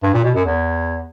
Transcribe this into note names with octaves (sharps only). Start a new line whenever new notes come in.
G2
A#2
B2
F#2
E2